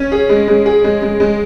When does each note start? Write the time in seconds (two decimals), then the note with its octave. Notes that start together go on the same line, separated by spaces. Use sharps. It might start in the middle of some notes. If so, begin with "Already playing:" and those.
Already playing: C#4
0.12 G#4
0.29 G#3
0.48 G#3
0.66 G#4
0.84 G#3
1.02 G#3
1.20 G#3